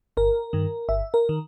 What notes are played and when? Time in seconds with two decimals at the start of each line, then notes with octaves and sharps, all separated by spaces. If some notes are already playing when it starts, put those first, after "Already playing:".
0.17 G1 A#4
0.53 G2 D#3
0.89 G1 E5
1.14 A#4
1.29 D#3